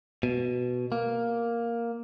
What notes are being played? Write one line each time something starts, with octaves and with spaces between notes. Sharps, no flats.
B2
A#3